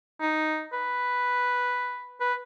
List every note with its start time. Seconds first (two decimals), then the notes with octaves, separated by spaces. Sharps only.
0.21 D#4
0.73 B4
2.21 B4